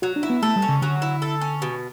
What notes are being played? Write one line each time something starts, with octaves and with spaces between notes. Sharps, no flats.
F#3 F#4
D4
E4
B3
A3 A4
G3
C#4
C#3
D3 F#3
E4
A4
C#4
B2